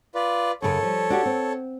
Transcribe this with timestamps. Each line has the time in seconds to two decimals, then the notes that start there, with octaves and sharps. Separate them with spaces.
0.15 F4 B4 D5
0.62 F#2 C#3 A4 A#4 C#5
0.83 F3 G3
1.10 D4 F#4 G4
1.26 C4